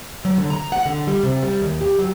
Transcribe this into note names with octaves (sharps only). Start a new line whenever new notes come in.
F#3
D3
A#5
F#5
D3
G3
C3
G3
D#2
G4
F#3